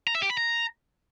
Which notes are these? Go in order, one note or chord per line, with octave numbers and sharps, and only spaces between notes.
A#5
E5
G4
B5
A#5